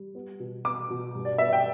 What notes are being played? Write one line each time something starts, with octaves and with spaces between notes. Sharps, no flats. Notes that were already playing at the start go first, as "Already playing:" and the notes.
Already playing: G3
B3
B2
B3 D6
B2
G2
D5
B3 E5
G5